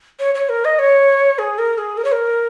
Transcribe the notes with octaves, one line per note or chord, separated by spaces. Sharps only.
C#5
C#5
A#4
D#5
C#5
G#4
A#4
G#4
A#4
C#5
A#4